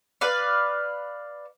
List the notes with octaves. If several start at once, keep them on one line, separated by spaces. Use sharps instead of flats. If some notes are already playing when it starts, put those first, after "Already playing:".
B4 D5 F5